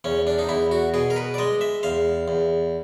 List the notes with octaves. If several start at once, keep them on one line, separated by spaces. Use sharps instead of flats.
E2 C#4
D4
D#4
E2 E4
F#4
B2 G#4
A#4
B4
D5
G#3 D#5
E5
E2 F5
E2